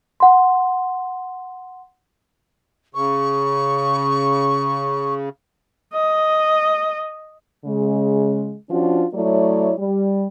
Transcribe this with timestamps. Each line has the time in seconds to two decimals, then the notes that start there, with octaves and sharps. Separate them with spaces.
0.20 F#5 C6
2.95 C#3 C#6
5.94 D#5
7.65 C#3 G#3
8.70 F3 C#4 D4 F4 F#4
9.14 F#3 A3 E4 C#5 D5
9.78 G3